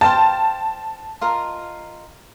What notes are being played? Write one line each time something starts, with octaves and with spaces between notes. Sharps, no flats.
C5 F5 G5 A5
F4 A#4 D#5